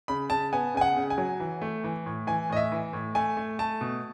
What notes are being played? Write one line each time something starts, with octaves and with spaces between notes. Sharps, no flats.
C#3 B5
C#3 A5
B3 G#5
C#3 G#5
F#5
C#3
G#5
F#3
E3
A3
E3
A2
E3 G#5
A2 D#5
E5
E3
A2
A3 G#5
A3
A3 A5
B2